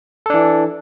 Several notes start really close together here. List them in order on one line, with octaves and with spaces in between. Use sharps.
A4 D4 E3